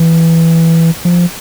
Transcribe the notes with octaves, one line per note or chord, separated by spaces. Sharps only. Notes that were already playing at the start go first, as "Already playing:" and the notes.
Already playing: E3
F3